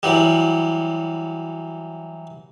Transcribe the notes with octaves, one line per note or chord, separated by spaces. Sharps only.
E3 F#3 G3